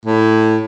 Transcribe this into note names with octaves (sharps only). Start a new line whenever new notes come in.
A2